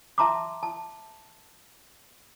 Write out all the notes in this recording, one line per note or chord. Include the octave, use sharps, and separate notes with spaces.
E5 A5 A#5 C6 D6
A5